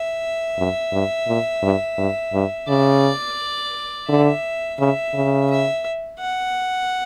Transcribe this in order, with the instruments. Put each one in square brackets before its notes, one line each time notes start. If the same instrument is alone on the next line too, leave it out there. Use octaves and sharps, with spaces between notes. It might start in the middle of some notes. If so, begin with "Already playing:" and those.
Already playing: [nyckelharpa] E5
[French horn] F#2
G2
A#2
G2
G2
G2
[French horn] C#3 [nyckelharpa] D5
[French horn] D3 [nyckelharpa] E5
[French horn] C#3 [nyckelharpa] E5
[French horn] C#3
[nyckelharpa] E5
F#5